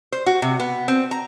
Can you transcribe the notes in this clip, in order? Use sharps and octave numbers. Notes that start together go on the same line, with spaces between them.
C5
F#4
C3
B3
C4
A#5